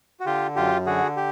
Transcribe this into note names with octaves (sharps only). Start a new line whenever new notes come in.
F#4
D3 F4 G4
F#2 F4 G4
D3 F#4 G#4
G4